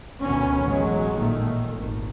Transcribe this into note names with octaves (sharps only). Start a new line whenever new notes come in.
D2 B2 D#3 B3 C#4
A1 F#3 G#3
A#2 D#3 A3
G#1